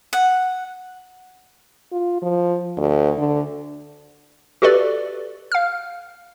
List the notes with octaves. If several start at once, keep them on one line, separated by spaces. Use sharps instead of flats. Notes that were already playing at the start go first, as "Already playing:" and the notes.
F#5
F4
F3
D2
D3
F#4 G4 A4 B4 D5
F5 F6